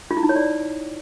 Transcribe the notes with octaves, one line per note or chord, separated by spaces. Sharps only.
F4
E4
D#4
C#5
D5